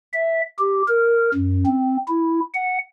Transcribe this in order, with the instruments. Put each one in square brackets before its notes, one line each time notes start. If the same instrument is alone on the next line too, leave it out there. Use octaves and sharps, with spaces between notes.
[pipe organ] E5
G4
A#4
F#2
C4
E4
F#5